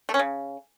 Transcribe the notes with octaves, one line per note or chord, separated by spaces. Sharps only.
A3
C#4
C#3